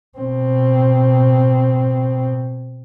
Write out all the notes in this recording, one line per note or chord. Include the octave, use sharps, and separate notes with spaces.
B2 C4